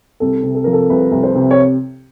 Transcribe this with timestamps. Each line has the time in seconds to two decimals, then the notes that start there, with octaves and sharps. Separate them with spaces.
0.20 C2 A4
0.43 C3
0.55 A4
0.64 F3 A#4
0.73 A4
0.90 C2 B4
1.12 C2
1.23 C5
1.35 C3
1.51 C#5